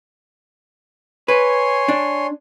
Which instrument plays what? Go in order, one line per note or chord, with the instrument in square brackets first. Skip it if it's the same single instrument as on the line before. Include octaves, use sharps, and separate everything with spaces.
[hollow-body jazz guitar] B4 [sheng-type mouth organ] C#5 G#5 C6
[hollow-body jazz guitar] D4